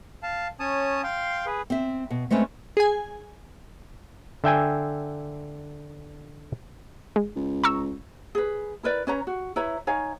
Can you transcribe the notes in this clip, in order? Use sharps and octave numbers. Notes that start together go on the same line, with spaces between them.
F5 A5
C#4 C#5 A5 D#6
F5 G5 C6
G#4 B4
C4 E5
B2
G#3 A3 C4 C#4 B4
G#4 G#5
D3 E5 G5 G#5
G#3
C#2
A#5 C#6 E6
G#4 B4
E4 A#4 B4 D5
C#4 B4 C#5 A#5
F#4
E4 B4 C#5 A#5
D#4 C#5 F5 G#5